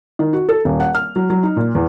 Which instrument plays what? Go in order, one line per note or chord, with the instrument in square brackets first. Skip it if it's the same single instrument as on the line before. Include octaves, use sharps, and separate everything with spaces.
[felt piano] D#3
F#4
A4
D#1
F#5
F6
F#3
F#3
D#4
A#2
E2